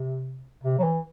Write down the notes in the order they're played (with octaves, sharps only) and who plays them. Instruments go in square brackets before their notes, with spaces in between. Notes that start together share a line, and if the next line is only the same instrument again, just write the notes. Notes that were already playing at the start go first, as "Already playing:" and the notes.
Already playing: [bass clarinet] C3
C3
F#3
E3